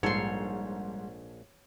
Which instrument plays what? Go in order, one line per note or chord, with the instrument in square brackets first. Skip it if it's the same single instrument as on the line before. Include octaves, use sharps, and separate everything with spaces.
[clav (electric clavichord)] A#1 A4 [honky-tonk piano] G#2 C7 [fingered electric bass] G3 [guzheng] C#5 C6